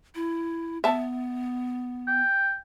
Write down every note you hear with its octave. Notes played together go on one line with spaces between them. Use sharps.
E4
B3 E5 A5
G5